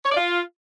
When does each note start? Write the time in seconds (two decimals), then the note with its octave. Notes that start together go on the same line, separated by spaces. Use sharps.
0.05 C#5
0.11 D5
0.16 F4